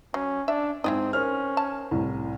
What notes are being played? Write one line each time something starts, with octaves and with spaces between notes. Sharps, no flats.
F#3 C#4
D4 E5
G#2 C4 E4 G#4 D#5
C#4 A#4 C5 F6
A5
C2 A2